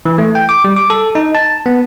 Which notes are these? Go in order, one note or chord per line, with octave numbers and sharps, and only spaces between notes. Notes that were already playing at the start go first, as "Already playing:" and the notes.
E3
A3
G5
D6
G3
D6
A4
D#4
A5
B3